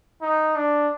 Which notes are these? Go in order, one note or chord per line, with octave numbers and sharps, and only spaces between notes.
D#4
D4